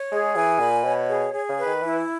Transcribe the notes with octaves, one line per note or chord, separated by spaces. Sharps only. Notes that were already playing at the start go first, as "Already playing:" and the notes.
Already playing: C#5
G#3 G#4
E3 G#5
A#2 B5
B2 C#5
G#4
G#4
C#3
B4
D#3
E3 E4